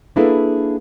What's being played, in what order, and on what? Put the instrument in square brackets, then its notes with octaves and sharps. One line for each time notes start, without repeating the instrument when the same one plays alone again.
[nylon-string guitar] A#3 D4 E4 G#4 A4 B4